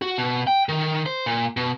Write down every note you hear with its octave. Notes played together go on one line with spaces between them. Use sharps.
F#4
B2
G5
D#3
C5
A#2
B2